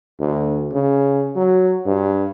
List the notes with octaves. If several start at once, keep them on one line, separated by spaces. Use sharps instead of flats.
D2
C#3
F#3
G2